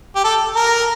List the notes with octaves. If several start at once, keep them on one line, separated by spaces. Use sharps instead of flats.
G4
A4
A#4